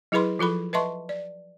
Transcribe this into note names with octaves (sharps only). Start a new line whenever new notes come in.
F#3 E4 G#4 B4 B5 C6
F3 F4 A4 B5
B4 D#5 E5 A5 C6 C#6
D5